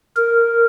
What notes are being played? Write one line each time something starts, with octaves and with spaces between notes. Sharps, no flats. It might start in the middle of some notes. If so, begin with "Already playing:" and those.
A#4